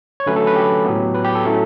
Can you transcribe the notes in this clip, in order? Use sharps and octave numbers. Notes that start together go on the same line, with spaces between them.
C#5
D3 F#3 A3 C#4 B4
A4
B4
G4
A2 F#3 B3
B4
G4
A4
A2 F#3 A3 C#4